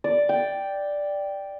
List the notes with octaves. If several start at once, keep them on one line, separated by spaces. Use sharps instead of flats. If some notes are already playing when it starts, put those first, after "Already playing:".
D5
G5